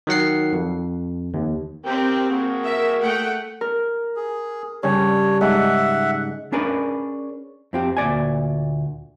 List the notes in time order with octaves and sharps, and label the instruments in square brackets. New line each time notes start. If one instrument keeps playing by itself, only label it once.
[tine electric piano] D#3 F#3 F#5 C7
F2
D#2
[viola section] C4 [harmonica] G4 A#4 G5
[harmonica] A#3 F#4 G#4
[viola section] A#4 E5
A3 F#5 G5
[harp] A#4
[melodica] G#4
[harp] G2 C#3 [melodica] C#5
[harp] G#2 [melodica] E5 F#5
[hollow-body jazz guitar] C#4 D4 G#4 A#4 B4
F2 C4 G4
D2 A#2 D5 G#5